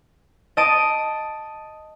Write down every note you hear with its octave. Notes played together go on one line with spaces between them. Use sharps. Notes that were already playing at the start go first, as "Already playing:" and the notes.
D#5 A5 D#6 D7